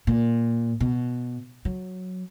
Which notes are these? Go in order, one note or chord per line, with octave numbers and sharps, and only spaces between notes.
A#2
B2
F#3